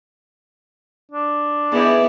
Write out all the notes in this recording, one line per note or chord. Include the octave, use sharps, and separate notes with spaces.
D4
E3 B3 D#4 E4 G#4 D5